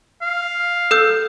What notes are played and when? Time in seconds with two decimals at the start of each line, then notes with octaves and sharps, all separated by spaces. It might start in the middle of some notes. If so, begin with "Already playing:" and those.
0.22 F5
0.91 A4 E6 G6